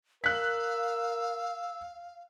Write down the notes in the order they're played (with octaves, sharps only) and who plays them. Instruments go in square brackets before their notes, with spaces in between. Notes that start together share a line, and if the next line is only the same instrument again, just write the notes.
[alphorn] A#4 [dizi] F5 [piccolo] E6 [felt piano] F#6 B6